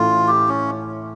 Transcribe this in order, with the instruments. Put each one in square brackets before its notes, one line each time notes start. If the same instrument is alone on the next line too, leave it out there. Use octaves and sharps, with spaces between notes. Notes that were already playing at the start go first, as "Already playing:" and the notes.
Already playing: [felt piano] A2 E3 A3 C#4 E4 [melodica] F4
[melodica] G4
C#4